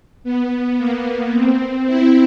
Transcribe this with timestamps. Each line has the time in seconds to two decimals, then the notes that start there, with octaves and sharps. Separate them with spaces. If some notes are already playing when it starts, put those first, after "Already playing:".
0.24 B3
0.78 A#3
1.33 C4
1.87 E4